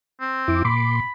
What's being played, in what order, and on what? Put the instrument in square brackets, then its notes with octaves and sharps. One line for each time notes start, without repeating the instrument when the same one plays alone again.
[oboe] C4
[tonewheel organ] F2 E4 D6
[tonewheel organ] A#2 C6 D6 [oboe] B5